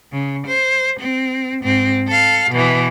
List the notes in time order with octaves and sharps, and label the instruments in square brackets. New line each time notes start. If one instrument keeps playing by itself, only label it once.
[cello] C#3
C5
C4
G#2 C4
A4 F5
B2 E3